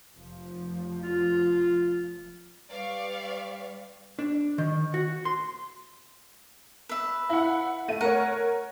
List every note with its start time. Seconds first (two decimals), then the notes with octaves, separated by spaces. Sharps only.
0.13 F1 F3
1.03 F4
2.71 G3 B4 D5 F5 C#6
4.19 D4
4.58 D#3
4.94 F#4
5.25 C6
6.89 B4 E5
7.29 E4 F#5
7.88 A3 D#7
8.01 A#4 C#5 F#5